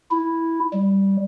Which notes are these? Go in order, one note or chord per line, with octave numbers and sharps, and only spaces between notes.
E4
G3